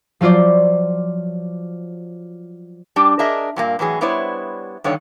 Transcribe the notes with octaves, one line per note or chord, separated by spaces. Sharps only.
F3 F#3 F4 C5 D5
G3 D4 G4
D4 G#4 A#4 D#5 E5
G2 A#2 A#3
A2 E3 F#3 G#4
G3 B3 D4 E4 C5 C#5
G2 D3 D#3 C#5